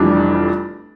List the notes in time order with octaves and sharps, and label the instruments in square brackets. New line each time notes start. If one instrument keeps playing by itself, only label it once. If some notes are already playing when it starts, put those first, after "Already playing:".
Already playing: [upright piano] F1 F2 E3 G3 D4